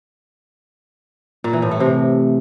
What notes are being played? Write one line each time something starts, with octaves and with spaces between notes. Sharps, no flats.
A#2
E3
A2
A3
C3